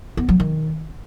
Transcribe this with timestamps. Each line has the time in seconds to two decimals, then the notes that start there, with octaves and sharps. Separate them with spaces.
0.17 B3
0.29 F#3
0.40 D#3